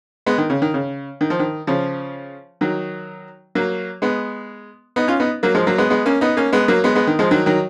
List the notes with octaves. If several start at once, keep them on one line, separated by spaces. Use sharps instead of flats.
G#3 B3
D#3
C#3
D#3
C#3
D#3
F3
D#3
C#3 F3
D#3 F#3
F#3 A#3
G#3 B3
B3 D#4
C#4 F4
B3 D#4
F#3 A#3
F3 G#3
F#3 A#3
G#3 B3
G#3 B3
A#3 C#4
B3 D#4
A#3 C#4
G#3 B3
F#3 A#3
G#3 B3
G#3 B3
D#3
F3 G#3
D#3 F#3
D#3 F#3